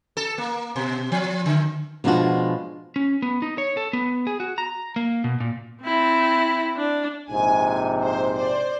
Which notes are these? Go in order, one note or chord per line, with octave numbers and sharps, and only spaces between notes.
A4
A#3
B2
F3
D3
B2 F3 G#3 D4 F4 F#4
C#4
B3
D#4
C#5
A4
B3
G#4
F#4
A#5
A#3
B2
A#2
C4 E4
D4
A#1 G#2 C3 G#5
C5
C5 D5